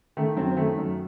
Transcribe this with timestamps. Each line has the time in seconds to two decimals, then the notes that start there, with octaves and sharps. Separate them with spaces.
0.17 D#3 A3
0.37 F#2 C4
0.56 D#3 A3
0.78 F#2